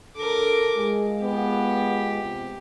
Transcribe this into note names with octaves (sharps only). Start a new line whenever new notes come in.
D2 D4 A4 A#4 D6
G#3 F4 G#4
B3 G4
C3